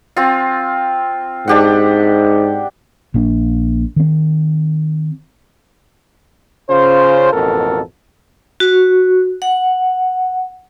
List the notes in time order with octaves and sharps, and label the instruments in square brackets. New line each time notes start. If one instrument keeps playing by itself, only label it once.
[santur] C4 F4
[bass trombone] G#2 [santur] D4 G4 F#5
[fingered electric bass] A#1 A#3 D4
D#3 C4
[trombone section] C#3 C#4 F4 C5
A1 F2 B2 A4 A#4
[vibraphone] F#4
F#5